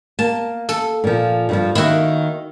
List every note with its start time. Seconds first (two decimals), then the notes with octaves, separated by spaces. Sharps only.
0.19 A#3 A5
0.69 A4
1.04 A#2 F3
1.49 G2 E3 F3
1.75 D#3 A#3 E4 F#4